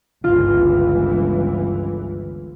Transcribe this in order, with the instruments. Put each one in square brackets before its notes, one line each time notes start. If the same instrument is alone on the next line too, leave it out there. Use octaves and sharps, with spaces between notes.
[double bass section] G1 C#2 E3 [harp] F4